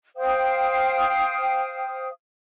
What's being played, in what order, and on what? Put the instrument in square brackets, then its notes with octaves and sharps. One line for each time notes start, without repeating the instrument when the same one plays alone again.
[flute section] C5 F5 G5 D#6